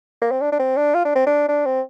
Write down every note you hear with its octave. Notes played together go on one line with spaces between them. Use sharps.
A#3
C4
D4
D4
C4
D4
F4
D4
C4
D4
D4
C4